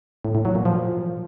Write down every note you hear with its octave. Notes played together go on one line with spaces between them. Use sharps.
A2
A2
F#3
A#2
F3